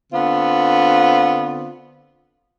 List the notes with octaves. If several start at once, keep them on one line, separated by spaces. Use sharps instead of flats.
D3 B3 C4 F4